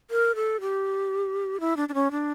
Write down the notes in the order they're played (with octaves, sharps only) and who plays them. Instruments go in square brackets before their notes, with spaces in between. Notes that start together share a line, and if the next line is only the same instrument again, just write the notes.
[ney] A#4
A4
G4
E4
D4
D4
C#4
D4